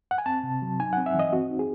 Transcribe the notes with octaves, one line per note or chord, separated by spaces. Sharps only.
F#5
G#5
C4 A5
C3
F#3
D#4 G#5
C4 F#5
E5
E3 D#5
C4 F#4
D#4
G#4